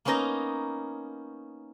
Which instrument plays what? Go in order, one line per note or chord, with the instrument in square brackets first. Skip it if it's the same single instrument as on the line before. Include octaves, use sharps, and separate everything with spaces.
[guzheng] A#3 B3 C#4 D#4 D#5 A#5